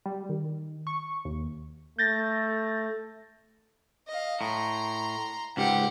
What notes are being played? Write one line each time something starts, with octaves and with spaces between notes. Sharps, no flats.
G3
D#3
C#6
D#2
A3 G6 A6 A#6
D#5 F5
A2 A#5 C6
C#2 G#2 G4 F#5